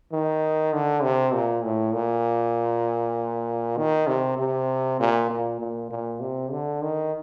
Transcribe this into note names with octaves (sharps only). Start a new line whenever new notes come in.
D#3
D3
C3
A#2
A2
A#2
D#3
C3
C3
A#2
A#2
A#2
A#2
C3
D3
D#3